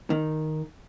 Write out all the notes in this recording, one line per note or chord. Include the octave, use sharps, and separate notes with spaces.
D#3